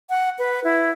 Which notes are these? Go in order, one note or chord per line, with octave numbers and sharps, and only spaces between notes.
F#5
B4
E4